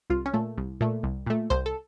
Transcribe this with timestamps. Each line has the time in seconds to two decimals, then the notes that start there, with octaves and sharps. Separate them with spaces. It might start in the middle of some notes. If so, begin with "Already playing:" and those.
0.10 C2 F4
0.26 C#4
0.34 A#2 A3
0.57 C2
0.81 A#2 A3
1.03 C2
1.26 A#2 A3
1.50 C2 C5
1.66 A4